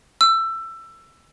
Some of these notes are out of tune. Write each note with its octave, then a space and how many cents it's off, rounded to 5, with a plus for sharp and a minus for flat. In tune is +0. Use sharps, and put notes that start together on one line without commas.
E6 +20